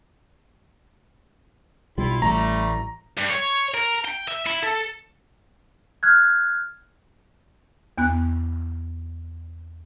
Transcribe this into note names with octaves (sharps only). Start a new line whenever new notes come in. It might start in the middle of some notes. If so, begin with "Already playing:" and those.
B1 G3 E4 F4
A1 G3 A3 A#5
G2
C#5
A#4
G5
E5
E4
A4
F6 F#6 G#6
E2 B3 F#6